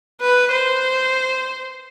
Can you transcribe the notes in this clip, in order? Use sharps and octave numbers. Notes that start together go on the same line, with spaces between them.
B4
C5